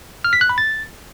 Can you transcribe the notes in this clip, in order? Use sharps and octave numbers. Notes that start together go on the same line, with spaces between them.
F6
B6
F#6
B5
A6